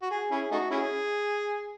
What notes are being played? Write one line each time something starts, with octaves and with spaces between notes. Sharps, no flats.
F#4
G#4
C#4 E4 G#4
A3 D#4 F#4
C#4 E4 G#4